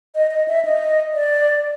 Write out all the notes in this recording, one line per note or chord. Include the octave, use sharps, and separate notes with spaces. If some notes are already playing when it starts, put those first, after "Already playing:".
D#5
D#5
E5
D#5
D5